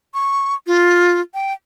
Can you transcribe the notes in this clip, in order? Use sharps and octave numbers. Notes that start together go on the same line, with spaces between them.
C#6
F4
G5